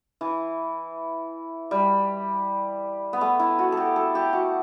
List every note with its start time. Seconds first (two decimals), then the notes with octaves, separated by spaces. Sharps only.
0.21 E3
1.71 G3
3.13 B3
3.21 A3
3.39 E4
3.59 F#4
3.72 G4 A4
3.96 A4
4.15 G4
4.33 F#4